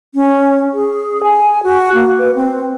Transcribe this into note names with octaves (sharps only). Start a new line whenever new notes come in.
C#4
G#4
G#5
F#4
A#3
B4
C4